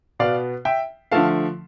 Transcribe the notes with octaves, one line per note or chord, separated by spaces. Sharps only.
B2 B3 D5 F5
E5 G5
D3 F3 A3 F5 A5